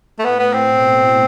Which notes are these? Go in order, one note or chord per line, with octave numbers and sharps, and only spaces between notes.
A3
A2 B3
B3
C4
B2